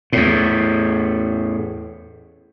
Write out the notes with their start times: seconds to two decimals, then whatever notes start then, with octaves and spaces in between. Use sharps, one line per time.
0.12 E2 A2